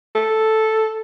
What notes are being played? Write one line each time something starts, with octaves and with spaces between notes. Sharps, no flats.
A4